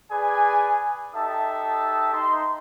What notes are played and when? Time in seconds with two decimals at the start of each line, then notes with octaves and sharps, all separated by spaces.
0.11 G#4 B4 D5 G#5
1.15 D#4 G4 A4 E5 A5 D#6
2.13 D#4 C6